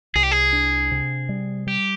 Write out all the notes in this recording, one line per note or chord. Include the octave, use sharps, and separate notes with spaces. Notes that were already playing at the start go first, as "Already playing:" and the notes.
C2 G#4
G4
G#4
D4
C3
G3
G3 G4